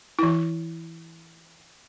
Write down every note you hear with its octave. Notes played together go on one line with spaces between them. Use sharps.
E3 E4